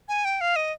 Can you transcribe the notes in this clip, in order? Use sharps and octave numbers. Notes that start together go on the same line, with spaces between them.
G#5
G5
F5
D#5